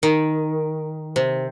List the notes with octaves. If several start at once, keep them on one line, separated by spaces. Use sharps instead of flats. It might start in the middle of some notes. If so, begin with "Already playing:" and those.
D#3
C3